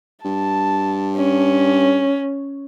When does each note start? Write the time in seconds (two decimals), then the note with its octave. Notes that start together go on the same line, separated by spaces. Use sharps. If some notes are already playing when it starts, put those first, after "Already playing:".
0.25 G2 A5
1.17 C#4